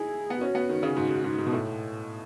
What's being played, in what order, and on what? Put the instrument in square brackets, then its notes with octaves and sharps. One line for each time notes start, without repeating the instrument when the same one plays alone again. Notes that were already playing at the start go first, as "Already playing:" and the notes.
Already playing: [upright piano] D#4 E4 [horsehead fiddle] G#4
[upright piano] B3
[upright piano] C#4 [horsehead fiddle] F#4
[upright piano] B3
D#3
C#3
[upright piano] G#2 [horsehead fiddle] F#4
[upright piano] G#2
G#2
G#2
B2
A2